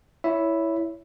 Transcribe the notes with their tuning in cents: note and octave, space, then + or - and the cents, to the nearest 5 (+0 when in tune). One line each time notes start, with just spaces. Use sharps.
E4 +0 C#5 +15 E5 +0